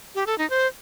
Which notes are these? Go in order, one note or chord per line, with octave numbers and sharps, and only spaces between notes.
G4
A4
D#4
C5